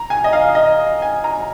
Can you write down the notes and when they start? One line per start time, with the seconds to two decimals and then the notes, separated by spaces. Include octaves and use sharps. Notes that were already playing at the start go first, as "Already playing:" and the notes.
Already playing: A#5
0.10 G#5
0.24 D#5
0.33 F5
0.55 D#5
1.02 G#5
1.24 A#5